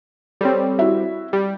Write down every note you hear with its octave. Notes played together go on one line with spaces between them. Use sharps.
G3 C4 A4 C#5
E4 F#4 E5
G3